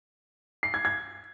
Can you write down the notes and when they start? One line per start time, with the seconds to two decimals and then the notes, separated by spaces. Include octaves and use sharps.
0.63 C7
0.74 G#6
0.85 G#6